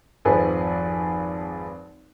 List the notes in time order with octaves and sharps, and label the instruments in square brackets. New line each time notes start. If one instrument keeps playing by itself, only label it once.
[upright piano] G#1 F2 F3 G#4 B4